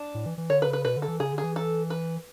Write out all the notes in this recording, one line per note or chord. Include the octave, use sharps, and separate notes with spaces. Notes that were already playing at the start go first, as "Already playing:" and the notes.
Already playing: D4
A2
E3
E3
D3 C#5
B4
C#3
B4
B2 B4
D3
A4
E3
C#3 G#4
D3
G#4
E3
A4
B4